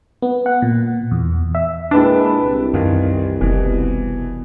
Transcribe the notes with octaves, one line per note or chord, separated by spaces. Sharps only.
B3
F#5
A#2
E2
E5
A#2 G#3 D4 E4 B4 G5 A5
C2
F#2 D#3 E3 F4
F1 B2 E3